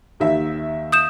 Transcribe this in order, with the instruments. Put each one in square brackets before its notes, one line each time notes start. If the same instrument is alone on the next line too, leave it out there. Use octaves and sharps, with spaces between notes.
[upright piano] D#2 D#3 E5
[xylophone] D#6 G6 E7